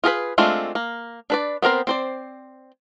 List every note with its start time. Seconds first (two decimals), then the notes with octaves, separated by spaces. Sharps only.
0.04 F4 G#4 A#4 B4
0.38 G#3 A3 C4 D4 F4
0.75 A#3
1.30 D4 B4 D5
1.62 B3 C4 A#4 C5
1.87 C4 C5 D5